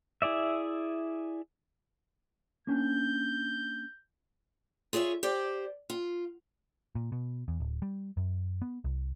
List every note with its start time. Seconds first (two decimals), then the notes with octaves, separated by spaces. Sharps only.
0.22 E4 G#4 D5 E5
2.67 A#3 C#4 D4 G6
4.93 F4 G#4 C#5 D#5 E5
5.23 G4 C5 D5
5.90 F4
6.95 A#2
7.12 B2
7.48 E2
7.60 D1
7.82 G3
8.17 F#2
8.62 B3
8.84 C2